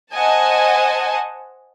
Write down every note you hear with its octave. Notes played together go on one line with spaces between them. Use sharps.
C5 D#5 F#5 G#5 A5